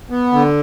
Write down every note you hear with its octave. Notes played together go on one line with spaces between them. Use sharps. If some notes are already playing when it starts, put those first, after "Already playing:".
B3
D3